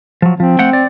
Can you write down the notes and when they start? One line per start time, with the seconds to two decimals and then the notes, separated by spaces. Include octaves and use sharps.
0.22 F3 F#3
0.40 F3 C4
0.59 A3 F#5 G5
0.73 D5